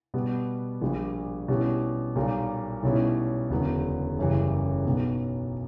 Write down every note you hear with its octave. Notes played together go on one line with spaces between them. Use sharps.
B2 G3 B3
A#1 A#2 G3
B2 G3 C#4 E4 G4
B1 A#2 G3 A#3
B1 B2 G3 C#4 E4
E1 D2 C#3 F#3 B3
F#1 F#2 C#3 E3 G3
B1 B2 F#3 B3